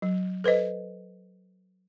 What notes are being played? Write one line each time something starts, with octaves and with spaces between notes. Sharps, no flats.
F#3
A4 B4 C5 D#5